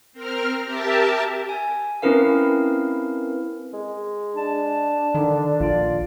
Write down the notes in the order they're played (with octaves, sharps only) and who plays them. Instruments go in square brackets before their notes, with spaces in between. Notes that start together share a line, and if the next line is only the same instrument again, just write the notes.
[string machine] C4 A#4 F6
G4 A#4 E5 A5
[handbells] G#5
C4 C#4 E4 A#4 B4 F5
[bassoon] G#3
[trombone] D4 [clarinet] A5
[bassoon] D3 [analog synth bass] D#3
[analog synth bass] A#1 [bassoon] F4 [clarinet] D5